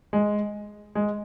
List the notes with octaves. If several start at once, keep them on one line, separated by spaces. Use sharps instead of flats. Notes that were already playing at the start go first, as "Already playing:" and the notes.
G#3
G#3